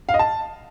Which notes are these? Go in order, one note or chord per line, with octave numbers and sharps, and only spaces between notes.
F5
D#5
A5